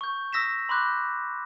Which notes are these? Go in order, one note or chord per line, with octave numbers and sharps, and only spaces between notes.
C#6 G6
D#6 E6 A#6 B6 E7
B5 C6 D6 F#6 G6